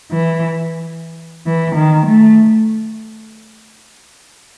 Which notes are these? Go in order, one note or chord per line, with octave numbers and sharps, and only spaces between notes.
E3
E3
D#3
A3